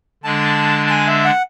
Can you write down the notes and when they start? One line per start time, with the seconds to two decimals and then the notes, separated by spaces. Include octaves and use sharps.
0.23 D3 G#3 D4 A5
0.87 A5
0.91 G#5
1.08 E5
1.25 F#5